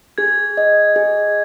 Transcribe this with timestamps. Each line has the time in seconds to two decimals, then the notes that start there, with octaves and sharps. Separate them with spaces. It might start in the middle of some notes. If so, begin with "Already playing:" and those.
0.18 G#4 G#6
0.57 D#5
0.96 G#4